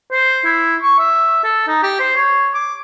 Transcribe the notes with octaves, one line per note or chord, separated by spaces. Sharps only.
C5
E4
C#6
E5
A4
D#4
G4
C5
C#5
D6